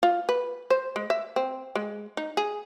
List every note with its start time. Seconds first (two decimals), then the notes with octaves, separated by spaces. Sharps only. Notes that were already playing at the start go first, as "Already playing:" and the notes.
0.03 F4
0.29 B4
0.70 C5
0.96 G#3
1.10 E5
1.36 C4
1.75 G#3
2.17 D#4
2.37 G#4